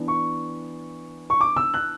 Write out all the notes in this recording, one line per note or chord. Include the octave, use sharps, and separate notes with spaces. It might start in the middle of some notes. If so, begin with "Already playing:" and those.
Already playing: E3 B3 D4
C#6
C#6
D6
E6
F#6